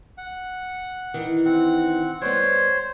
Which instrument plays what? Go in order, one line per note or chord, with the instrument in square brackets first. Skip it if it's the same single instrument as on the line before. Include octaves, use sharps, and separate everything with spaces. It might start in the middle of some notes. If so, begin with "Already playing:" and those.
[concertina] F#5
[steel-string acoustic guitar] D#3 E3
[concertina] C4 F#5
[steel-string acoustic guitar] G3 B3 [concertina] C5 C#5